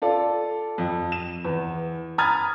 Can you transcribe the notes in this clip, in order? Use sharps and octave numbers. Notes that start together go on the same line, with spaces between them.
F4 A4 D5 F5
F2
E7
E2
A#5 B5 D#6 F6 G#6 A6